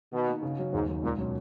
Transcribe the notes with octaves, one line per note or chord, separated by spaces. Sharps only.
B2 D#3
A#3 D#4
C#3
F#3 C#4 F#4
D#2 G#2
D#3 F#3
C#2 A#2
B2 F#3 C#4